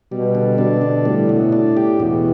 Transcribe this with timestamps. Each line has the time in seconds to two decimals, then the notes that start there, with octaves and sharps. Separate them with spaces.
0.12 B2 G3
0.35 D3
0.58 B2 D4
0.82 D3
1.05 A2 G3
1.29 B2
1.52 D4
1.77 G4
2.00 E2 B2